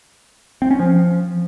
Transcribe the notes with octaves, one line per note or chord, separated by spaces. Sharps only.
C4
C#4
F3